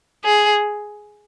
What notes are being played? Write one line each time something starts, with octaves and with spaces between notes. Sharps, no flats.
G#4